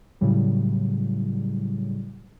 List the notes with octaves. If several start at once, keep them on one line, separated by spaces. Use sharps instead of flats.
A2 C#3 F#3 G3